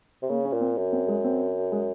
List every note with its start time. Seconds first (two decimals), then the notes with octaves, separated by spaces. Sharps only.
0.22 C3
0.29 C#3 A#3
0.45 C#4
0.52 A#2
0.61 C4
0.77 F#2
0.93 C4
1.08 G#3
1.24 C4
1.72 G#3